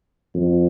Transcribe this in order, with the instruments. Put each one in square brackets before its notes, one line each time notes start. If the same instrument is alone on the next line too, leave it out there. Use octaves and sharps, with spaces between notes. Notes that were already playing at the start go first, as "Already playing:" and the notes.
[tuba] F2